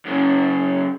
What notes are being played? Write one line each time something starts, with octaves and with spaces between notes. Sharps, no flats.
F#2 C#3